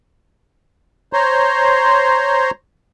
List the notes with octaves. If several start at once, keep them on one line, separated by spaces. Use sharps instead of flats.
C5 C#5 A#5 C6